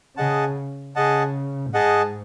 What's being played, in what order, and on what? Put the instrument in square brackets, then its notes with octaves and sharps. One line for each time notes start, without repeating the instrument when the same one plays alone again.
[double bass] C#3 [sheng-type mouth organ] G#4 D#5 F#5 A5
[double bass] C#3 [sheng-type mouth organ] G#4 D#5 F#5 A5
[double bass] G#2 [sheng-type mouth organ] G#4 D#5 F#5 A5